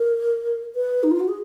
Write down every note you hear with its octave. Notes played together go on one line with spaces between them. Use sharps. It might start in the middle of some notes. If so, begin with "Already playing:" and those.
Already playing: A#4
B4
D#4
F4
F#4
G#4